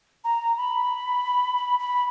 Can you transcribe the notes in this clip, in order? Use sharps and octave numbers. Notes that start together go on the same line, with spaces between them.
A#5
B5
B5
B5